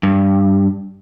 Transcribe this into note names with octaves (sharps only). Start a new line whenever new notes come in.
G2